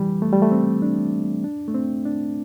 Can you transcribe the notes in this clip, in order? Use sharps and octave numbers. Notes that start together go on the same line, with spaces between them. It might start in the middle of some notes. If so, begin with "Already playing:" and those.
Already playing: E3 G3
A3
G3
A3
C4
D4
D4
A3
C4
D4